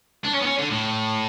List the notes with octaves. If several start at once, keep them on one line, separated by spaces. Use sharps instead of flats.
D4
C#4
B3
C#4
D3
A2